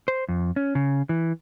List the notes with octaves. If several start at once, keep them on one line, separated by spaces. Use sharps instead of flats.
C5
F2
C#4
C#3
E3